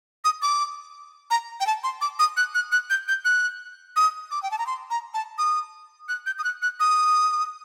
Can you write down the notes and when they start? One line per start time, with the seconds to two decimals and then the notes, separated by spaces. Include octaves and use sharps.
0.24 D#6
0.42 D6
1.30 A#5
1.60 G5
1.66 A5
1.83 C6
2.01 D6
2.19 D#6
2.37 F#6
2.54 F#6
2.72 F#6
2.90 G6
3.08 G6
3.25 F#6
3.96 D#6
4.31 D6
4.43 G5
4.51 A5
4.58 A#5
4.66 C6
4.90 A#5
5.14 A5
5.38 D#6
6.08 F#6
6.26 G6
6.38 D#6
6.44 F#6
6.62 F#6
6.80 D#6